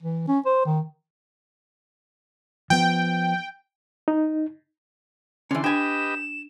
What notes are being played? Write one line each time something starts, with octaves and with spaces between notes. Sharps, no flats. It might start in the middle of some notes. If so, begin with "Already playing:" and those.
E3
C#4
C5
D#3
F3 B3 G5
D#4
D3 E3 C#4 C6
D4 G4 B4 D#5 G5 G#5 E7